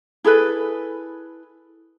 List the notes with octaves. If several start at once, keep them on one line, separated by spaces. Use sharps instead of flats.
E4 G#4 A4 B4